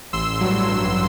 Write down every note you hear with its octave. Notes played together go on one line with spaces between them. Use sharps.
A1 C6 E6
G2 F#3
A1